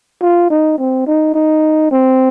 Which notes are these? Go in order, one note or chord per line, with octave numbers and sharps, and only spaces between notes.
F4
D#4
C4
D#4
D#4
C4